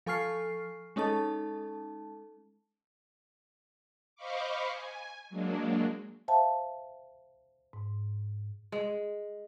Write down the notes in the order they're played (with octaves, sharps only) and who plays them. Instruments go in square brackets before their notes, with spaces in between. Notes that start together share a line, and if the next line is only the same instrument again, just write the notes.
[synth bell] F3 A4 G#5 C#6 F6 C7
G#3 C#4 D#4 A4 A5
[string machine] C5 D#5 F5 B5 C#6 D6
G#5
F#3 G#3 A#3 D4
[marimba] C5 E5 F5 G5 A5
G#2
[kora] G#3